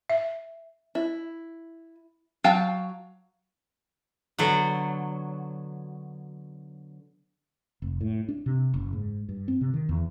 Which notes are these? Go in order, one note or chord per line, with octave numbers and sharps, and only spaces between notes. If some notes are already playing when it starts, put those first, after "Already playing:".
E5
E4
F#3 F5 G5 A5
D3 F#3 B3 F#5
F1
A2
D4
C3
F#1
G#2
G2
C4
C3
D#3
E2